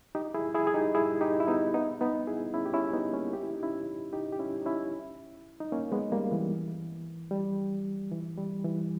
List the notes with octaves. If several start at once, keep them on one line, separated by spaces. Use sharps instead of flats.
D#4 G4
E4 G#4
E4 G#4
G#4
D#4 G4
E4 G#4
D#4 G4
E4
B3 D#4
B3 D#4
B3 D#4
E4 G#4
C#4 E4
G4
C#4 E4
B3 D#4
A#3 C#4
G4
E4
D#4
C#4 E4
D#4 G4
G4
C#4 E4
D#4
C#4 E4
D#4
A#3 C#4
G#3 B3
G3 A#3
E3
G3
E3
G3
E3